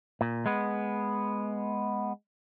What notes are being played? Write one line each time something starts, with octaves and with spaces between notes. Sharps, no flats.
A#2
G#3 B3